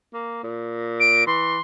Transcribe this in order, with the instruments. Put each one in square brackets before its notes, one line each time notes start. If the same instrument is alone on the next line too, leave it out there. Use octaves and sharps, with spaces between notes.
[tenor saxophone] A#3
A#2
[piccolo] D7
[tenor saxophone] E3 [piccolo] C6